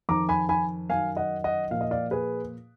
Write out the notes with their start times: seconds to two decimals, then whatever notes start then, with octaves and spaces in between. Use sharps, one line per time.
0.09 F2 D#3 A#5 D6
0.29 G#5 B5
0.49 G#5 B5
0.89 F#2 D#3 F5 G#5
1.17 D#5 F#5
1.44 D#5 F#5
1.71 A#2 F3 F5
1.81 D#5
1.91 D5 F5
2.11 G#4 B4